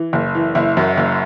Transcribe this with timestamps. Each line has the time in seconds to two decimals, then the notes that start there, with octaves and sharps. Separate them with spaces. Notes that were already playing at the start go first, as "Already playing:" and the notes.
Already playing: E3
0.13 F#1
0.35 E3
0.55 F#1 E4
0.77 F#2
0.97 F#1